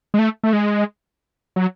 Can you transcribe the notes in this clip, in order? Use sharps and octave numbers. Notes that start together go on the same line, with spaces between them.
G#3
A3
A3
G#3
F#3